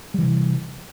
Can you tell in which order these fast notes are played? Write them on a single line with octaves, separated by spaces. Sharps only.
G3 E3 C3